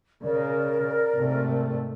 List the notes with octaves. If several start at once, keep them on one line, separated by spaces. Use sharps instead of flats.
C#3 A#4 D5
G#2 C3 A3